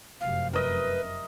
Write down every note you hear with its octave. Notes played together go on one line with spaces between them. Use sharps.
F1 F#2 C3 F5
A#4 B4 D#5 E5